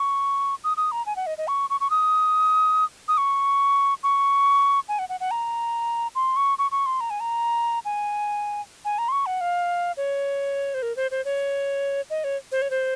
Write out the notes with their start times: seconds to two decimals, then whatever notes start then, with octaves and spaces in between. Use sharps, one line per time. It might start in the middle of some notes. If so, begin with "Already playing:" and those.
Already playing: C#6
0.64 D#6
0.77 D#6
0.92 A#5
1.06 G#5
1.16 F#5
1.27 D#5
1.38 D#5
1.48 C#6
1.70 C#6
1.81 C#6
1.90 D#6
3.08 D#6
3.18 C#6
4.03 C#6
4.89 G#5
4.99 F#5
5.09 F#5
5.20 F#5
5.31 A#5
6.15 C6
6.36 C#6
6.58 C#6
6.71 C#6
6.86 C6
7.01 A#5
7.10 G#5
7.20 A#5
7.85 G#5
8.85 G#5
8.98 A#5
9.09 C6
9.12 C#6
9.26 F#5
9.41 F5
9.97 C#5
10.74 C5
10.82 A#4
10.96 C5
11.11 C5
11.25 C#5
12.10 D#5
12.24 C#5
12.52 C5
12.62 C#5
12.70 C5